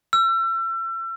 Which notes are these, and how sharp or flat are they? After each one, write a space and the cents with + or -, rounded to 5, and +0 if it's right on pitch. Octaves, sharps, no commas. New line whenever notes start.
E6 +35